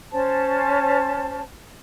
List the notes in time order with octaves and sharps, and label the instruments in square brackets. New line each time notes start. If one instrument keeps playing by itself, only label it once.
[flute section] C#4 C5 A5